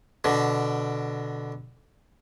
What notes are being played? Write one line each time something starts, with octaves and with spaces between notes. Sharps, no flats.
B2 D3